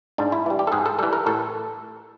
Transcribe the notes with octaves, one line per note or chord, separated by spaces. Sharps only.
G#2 D4
E4
E3 G3
G4
A4
G#2 G#4
A4
E3 G3 A4
A#4
A2 A4